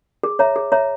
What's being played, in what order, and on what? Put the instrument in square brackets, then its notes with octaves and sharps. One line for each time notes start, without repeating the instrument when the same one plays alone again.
[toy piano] G#4
C#5 E5 A#5
G#4
C#5 E5 A#5